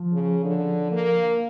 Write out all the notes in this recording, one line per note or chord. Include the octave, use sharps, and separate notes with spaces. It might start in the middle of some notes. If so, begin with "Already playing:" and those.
Already playing: F3
C#3
D3
A#3